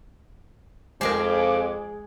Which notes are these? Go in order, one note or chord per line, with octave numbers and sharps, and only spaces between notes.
F2 G#3 G#4 A#4 C5 D6